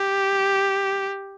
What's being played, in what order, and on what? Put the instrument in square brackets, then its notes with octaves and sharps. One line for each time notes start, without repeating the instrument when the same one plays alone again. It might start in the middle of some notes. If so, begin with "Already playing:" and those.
Already playing: [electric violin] G4